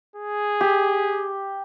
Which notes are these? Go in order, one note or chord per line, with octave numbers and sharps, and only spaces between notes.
G#4
G4